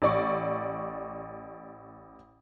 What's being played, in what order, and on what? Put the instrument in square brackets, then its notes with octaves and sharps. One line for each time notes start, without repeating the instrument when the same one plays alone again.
[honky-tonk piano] A1 D5 C#6